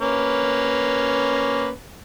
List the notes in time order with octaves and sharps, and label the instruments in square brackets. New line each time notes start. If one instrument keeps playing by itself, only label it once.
[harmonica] A#3 C#4 B4